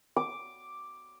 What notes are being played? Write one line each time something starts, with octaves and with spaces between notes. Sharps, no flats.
D6